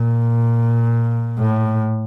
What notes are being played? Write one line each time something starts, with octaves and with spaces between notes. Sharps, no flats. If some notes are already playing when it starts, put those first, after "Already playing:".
Already playing: A#2
A2